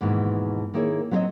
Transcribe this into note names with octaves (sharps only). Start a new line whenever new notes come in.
D#2 G#2 B2 D#3 E3
D#3 A#3 E4 G#4 C#5
F#3 C4 E4 F#4 C#5 D#5